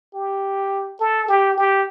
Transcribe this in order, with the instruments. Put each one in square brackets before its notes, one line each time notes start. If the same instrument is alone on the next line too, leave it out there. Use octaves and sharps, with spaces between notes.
[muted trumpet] G4
A4
G4
G4